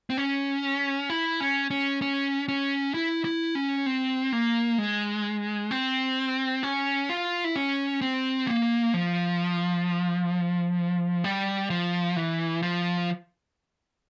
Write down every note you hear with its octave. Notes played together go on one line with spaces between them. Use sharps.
C4
C#4
E4
C#4
C#4
C#4
C#4
E4
E4
C#4
C4
A#3
G#3
C4
C#4
F4
E4
C#4
C4
A#3
F3
G3
F3
E3
F3